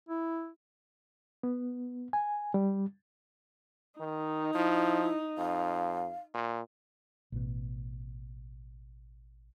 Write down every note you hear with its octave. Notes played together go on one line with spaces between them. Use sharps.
E4
B3
G#5
G3
D#3 D#4
F3 E4
F2 F5
A#2
A1 B2